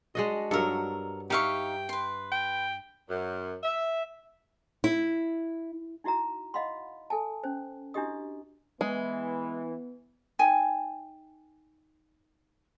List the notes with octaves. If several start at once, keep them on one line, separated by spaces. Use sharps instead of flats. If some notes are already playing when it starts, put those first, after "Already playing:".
G#3 D4 F#4 D#5
G2 F#3 A4 A#4
D#4 G4 E5 F5 G5 C#6
B4 C6
G5
F#2
E5
E4
D#4 E4 F#4 E5 A#5
D#5 F5 F#5 B5 C6
A4 G#5 A5
C#4 C5
D4 E4 F#4 G4 D#5 D#6
E3 G#3 B3
D#4 G5 G#5